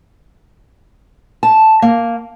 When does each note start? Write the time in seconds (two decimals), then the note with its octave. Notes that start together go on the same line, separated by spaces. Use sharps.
1.43 A5
1.82 A#3